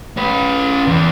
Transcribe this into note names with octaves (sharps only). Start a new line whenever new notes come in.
C#4 B4
E2